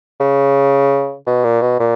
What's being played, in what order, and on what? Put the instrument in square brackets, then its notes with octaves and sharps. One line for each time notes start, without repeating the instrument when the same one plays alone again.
[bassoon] C#3
B2
A#2
B2
A#2